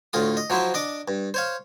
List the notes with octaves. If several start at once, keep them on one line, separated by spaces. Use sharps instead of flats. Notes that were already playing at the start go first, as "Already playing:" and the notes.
D2 A2 F4 D#6
D#5
F3 F#3 E4 C5
D4 D#5 D6
G2
C5 C#5 F5